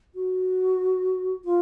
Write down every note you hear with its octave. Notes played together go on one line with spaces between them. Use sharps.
F#4
F4